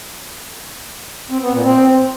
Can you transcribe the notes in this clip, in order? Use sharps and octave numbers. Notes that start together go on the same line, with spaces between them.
C4
B3
A#2
C4